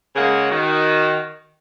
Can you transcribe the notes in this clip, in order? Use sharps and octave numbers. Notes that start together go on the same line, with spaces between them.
C#3 G#3 A#3 G#4 F#5 G#5
D#3 F#4